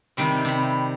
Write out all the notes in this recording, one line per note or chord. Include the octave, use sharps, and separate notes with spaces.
C3 D#3 G3 C4
C3 B5